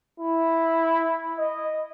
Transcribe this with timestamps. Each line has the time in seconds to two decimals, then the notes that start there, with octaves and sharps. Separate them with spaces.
0.20 E4
1.38 D#5